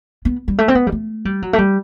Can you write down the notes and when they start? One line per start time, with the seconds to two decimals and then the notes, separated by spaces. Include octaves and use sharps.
0.25 B3
0.48 G3
0.58 A3
0.68 C4
0.75 B3
0.87 G3
0.92 A3
1.25 G3
1.42 F#3
1.53 A3
1.58 G3